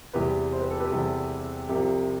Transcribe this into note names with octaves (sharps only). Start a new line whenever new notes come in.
E2 C3 E3 G3 G4 B4
C5
B4
A4
G4 B4
E2 C3 E3 G3 A4
C2 C3 F3 G4